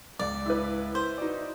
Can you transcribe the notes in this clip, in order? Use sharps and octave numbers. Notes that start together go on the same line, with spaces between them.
C#2 G#2 D5
E4 B4
C5
D#4 F#4 D5